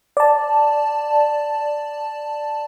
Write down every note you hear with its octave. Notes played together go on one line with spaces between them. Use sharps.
D5 A5